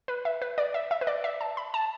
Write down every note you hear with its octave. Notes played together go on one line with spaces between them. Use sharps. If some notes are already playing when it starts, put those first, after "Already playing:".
B4
E5
B4
D5
E5
E5
B4
D5
E5
A5
B5
A5